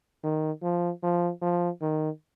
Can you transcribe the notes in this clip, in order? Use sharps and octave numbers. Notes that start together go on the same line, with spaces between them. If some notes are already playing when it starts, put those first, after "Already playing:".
D#3
F3
F3
F3
D#3